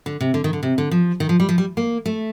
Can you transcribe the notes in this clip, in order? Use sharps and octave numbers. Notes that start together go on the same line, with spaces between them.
D3
C3
D3
D#3
D3
C3
D3
F3
D#3
F3
G3
F3
G3
A#3
A3